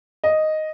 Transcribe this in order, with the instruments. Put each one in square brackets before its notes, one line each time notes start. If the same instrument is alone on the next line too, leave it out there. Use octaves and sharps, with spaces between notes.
[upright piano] D#5